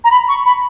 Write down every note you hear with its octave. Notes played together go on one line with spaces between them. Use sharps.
A#5
B5
C#6
B5